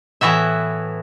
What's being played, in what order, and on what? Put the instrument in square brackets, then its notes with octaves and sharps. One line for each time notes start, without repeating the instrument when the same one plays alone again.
[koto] A2 E3 B3 F#4 E5